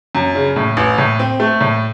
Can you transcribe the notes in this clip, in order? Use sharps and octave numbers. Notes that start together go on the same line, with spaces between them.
F#2
C#3
A2
A1
A2
C4
A3
A2